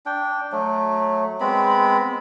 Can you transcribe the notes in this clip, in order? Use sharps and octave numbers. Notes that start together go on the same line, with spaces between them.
D4 G5
F#3 A3
G#3 B3 C4 B5